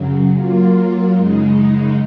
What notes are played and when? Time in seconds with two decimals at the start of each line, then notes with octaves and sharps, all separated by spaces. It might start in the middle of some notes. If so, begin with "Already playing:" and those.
Already playing: F#2 C#3 F#3
0.33 F#3 A#3 F4
1.13 F#2 C#3 G#3 D#4